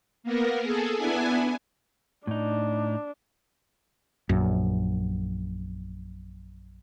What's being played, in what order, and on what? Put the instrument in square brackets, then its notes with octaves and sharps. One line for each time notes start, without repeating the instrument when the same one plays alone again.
[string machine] A#3 B3 A#4
G#4 A4
B3 D4 E4 G#5
[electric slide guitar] A2 D#4 [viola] D4
[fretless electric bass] A#1 F#2